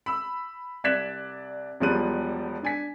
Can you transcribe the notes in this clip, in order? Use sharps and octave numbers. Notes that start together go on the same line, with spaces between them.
B5 E6
C2 D5 F#6 G#6 B6 E7
E1 E2 F3 G3 F#6 D#7
D4 G#5 B6